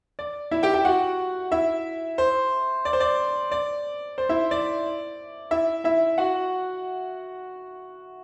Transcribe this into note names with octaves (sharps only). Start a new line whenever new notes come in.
D5
E4 E5
G4 G5
G4 G5
F#4 F#5
E4 E5
C5
D5
C5
D5
D5
C5
E4 E5
D5
E4 E5
E4 E5
F#4 F#5